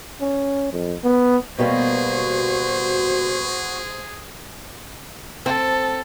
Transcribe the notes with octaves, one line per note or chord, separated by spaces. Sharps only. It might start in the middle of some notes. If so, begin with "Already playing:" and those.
C#4
F2
B3
B2 G3 A#3 F#4 G#4 C5
C4 A4